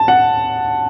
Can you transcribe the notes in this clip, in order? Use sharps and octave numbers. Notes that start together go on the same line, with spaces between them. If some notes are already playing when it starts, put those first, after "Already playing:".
Already playing: A5
F#5